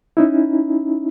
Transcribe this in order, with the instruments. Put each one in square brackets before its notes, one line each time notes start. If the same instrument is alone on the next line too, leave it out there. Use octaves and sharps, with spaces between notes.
[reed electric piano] C#4 D#4 E4